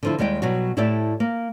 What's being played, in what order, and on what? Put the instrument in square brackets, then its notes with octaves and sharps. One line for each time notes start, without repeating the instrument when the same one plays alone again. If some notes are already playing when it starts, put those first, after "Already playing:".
[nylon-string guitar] D3 F3 E4
D#2 G3 G#3 D#5 G5
B2 F#3 G3 F#4
A2 E4 G4 A4 D5 E5
A#3